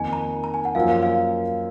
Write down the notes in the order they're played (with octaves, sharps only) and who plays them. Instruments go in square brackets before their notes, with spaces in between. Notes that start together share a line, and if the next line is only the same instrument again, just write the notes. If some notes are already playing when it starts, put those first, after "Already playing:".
Already playing: [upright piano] F2 D#3 A#3 D#4 [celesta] G#5
[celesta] A#5
A#5
G#5
F#5
[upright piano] F#2 F3 A#3 F4 [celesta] F5
[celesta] F5
F5